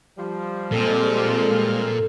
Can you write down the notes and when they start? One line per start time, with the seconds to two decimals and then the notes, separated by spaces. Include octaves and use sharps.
0.18 F3 G3
0.72 A#2 G#3 C4 A4 F6